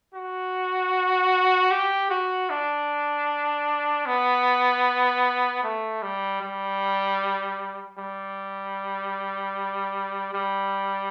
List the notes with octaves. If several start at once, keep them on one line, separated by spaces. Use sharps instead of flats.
F#4
G4
F#4
D4
B3
A3
G3
G3
G3
G3